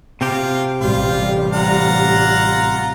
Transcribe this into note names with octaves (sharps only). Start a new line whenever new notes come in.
C3 C4 F4 G4
A1 G3 F4
F4 F#5 A#5